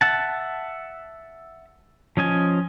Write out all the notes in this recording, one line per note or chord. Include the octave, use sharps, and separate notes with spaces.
E5 F#5 A5
F3 C#4 D#5 G#5